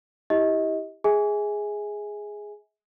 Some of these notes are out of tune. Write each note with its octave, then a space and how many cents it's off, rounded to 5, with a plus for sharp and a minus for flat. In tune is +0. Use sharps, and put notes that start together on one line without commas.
E4 -25 G4 +0 D#5 +30
G#4 +0 E5 -40 G#5 +0